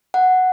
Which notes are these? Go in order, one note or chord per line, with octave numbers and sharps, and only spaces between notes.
F#5